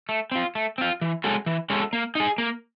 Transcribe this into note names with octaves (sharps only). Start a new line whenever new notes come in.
A3
C4 F4
A3
C4 F4
E3
G#3 C#4 F#4 A4
E3
G#3 C#4 F#4 A4
A#3
D#4 G#4
A#3